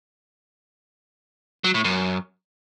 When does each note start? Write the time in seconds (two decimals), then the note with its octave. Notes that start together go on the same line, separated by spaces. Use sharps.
1.64 F#3
1.74 A2
1.84 F#2